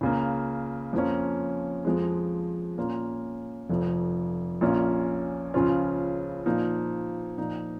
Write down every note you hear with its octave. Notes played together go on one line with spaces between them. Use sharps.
C#2 C#3 A#3
F2 F3 A#3 C#4
F2 F3 G#3
A#2 A#3 C#4 F4
F1 F2 F3
A#1 A#2 A#3 C#4 F4
C#2 C#3 F3 C#4 F4
A#2 F3 A#3 D#4
A#2 F3 A#3 D#4